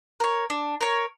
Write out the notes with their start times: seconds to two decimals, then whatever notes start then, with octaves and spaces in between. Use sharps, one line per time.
0.20 A#4 C#5
0.50 D4
0.81 A#4 C#5